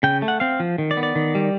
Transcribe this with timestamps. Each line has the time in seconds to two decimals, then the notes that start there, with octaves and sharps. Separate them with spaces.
0.03 C#3 G5
0.22 A3
0.28 F#5
0.40 C4 F5
0.60 F3
0.78 D#3
0.91 D5
0.97 B3
1.03 D5
1.16 D#3
1.35 G3